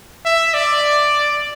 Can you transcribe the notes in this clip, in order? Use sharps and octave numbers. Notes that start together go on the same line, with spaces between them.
E5
D5